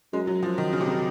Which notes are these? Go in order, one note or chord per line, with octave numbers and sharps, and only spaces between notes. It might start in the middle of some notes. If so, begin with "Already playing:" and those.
F#2 G#3
F#3
F3
D#3
C#3
C3
C#3